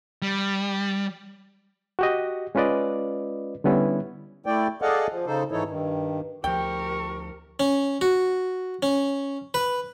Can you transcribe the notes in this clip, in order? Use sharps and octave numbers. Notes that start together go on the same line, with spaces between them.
G3
F#4 G4 D#5
G#3 C#4 F4 B4 D5 D#5
D3 G3 B3 C#4 E4
A3 E4 D5 G5
G#4 A4 D5 D#5 F5 F#5
F3
C#3 D#4 A4 C5
G#2 E3 D#4 E4 A4 C#5
G2 D#3
D2 F3 G4 A#4 G5 C#6
C#4
F#4
C#4
B4